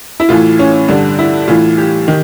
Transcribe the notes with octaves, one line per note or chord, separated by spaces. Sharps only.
E4
A2 E3 F4
C#4
G2 D3 D4
E4
A2 E3 F4
G4
D#3 G4